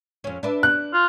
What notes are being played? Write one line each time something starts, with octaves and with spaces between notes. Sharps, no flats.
F2 C#4
D4 B4 E5
F#6
F4